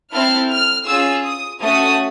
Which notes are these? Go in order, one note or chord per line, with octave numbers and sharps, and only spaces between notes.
C4 E4 A4 F6
F6
C#4 F4 G#4 E6
D#6
A3 C#4 F#4 A4 D#6